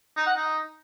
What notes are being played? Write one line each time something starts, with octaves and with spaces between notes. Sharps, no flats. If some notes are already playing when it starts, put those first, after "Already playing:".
D#4
F#5
D#4